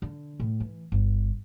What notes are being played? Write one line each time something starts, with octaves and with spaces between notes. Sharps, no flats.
D3
A2
E3
G1